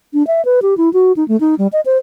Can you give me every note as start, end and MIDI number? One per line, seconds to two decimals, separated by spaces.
0.14 0.26 62
0.27 0.44 76
0.45 0.60 71
0.62 0.77 67
0.77 0.92 64
0.93 1.12 66
1.17 1.27 63
1.28 1.39 57
1.40 1.55 63
1.59 1.67 55
1.73 1.81 75
1.86 1.98 72